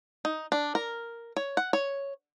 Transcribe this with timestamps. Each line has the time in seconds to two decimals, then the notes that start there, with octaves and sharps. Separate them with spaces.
0.25 D#4
0.52 D4
0.75 A#4
1.36 C#5
1.57 F#5
1.73 C#5